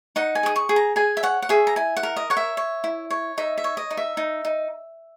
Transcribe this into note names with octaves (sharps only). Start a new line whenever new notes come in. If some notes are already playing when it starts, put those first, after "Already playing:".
D#4 F#5
G#5
G#4 D#6
C#6
G#4
A#5
G#4 G#5
E5
C#5 F#5
F#5
G#4 E5
A#5
E4 G#5
F#5
A#4
D#5
C#5 F#5
E5
C#5
E4
C#5
D#4 E5
E5
C#5
D#5
D#4
E5
D#4
D#4